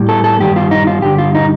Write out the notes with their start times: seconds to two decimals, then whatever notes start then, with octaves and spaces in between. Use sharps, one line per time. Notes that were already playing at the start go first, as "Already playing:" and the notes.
Already playing: A2 G3
0.09 A4
0.24 A4
0.39 G2 D#3 G3 G4
0.56 F4
0.71 D#4
0.87 F4
1.02 G2 D3 G3 G4
1.18 F4
1.35 D#4